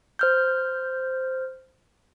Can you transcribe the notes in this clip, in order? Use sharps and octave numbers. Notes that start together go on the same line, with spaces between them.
C5 F6 G6